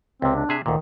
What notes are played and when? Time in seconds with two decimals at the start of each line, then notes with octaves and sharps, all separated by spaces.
0.22 C#2 C3 C4
0.36 D4
0.49 C3 G#4 E5
0.66 D2 A#2 D#3